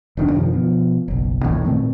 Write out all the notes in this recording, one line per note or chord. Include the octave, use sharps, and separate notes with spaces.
F1 D#3 C#4 D4
F#2 C3 D#3 F3
B2 F3
F#1 B1
E1 A#1 A2 D#3
A#2 D#3 A3 C4